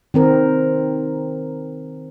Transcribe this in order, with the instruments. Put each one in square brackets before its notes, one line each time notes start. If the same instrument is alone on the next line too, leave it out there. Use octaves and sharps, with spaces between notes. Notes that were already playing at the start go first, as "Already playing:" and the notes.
[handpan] D#3 C4 A#4